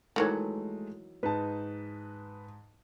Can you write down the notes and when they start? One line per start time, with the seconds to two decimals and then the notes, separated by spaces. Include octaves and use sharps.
0.16 D#3 E3 F#3 G#3 A3
1.23 G#2 D#4 B4 A5